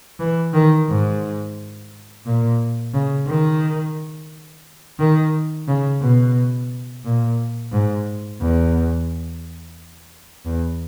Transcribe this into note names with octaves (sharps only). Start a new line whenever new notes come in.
E3
D#3
G#2
A#2
C#3
D#3
D#3
C#3
B2
A#2
G#2
E2
E2